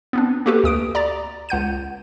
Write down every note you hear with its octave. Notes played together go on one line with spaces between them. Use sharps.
B3 C4 D4
A#3 F#4 G4 A4 B4
D2 D#6 D7
D5 A#5 D6 A6
C#2 F#5 G6 D#7